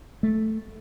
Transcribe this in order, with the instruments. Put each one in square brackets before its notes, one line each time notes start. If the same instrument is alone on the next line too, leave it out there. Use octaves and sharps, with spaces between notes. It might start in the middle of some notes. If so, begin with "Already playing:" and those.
[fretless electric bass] A3